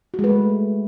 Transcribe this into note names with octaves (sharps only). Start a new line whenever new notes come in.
F#4
G#3
B4
A3